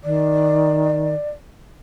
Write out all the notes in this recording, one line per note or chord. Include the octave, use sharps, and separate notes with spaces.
D#3 D5